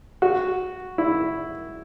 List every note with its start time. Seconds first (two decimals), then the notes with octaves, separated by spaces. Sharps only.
0.22 F#4
0.98 E4